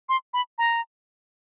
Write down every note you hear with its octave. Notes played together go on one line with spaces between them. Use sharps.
C6
B5
A#5